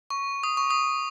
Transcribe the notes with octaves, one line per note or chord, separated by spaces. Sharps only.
C#6
D#6
C#6
D#6